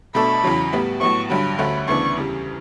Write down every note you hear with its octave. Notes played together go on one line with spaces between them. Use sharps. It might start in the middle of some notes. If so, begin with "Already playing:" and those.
B2 A3 D4 A4 B5
E2 C#3 F#3
A2 G3 B3
A2 F#3 B3 C#6
G2 D3 F#3 B5
D2 D3 A3 C#4 F#4 B5
D2 C#3 E3 B3 D4 C#6
E2 C#3 G3